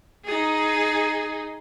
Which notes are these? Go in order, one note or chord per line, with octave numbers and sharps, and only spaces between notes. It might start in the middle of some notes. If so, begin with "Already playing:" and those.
D#4 G#4